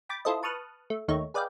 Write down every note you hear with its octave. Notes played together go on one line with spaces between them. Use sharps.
G5 B5 D6 A6
E4 F4 A4 C5 D#5
B4 A5 C#6 D#6 F6 F#6
A3
D#2 A3 D#4 C#5
G#4 B4 D5 D#5 F5 G5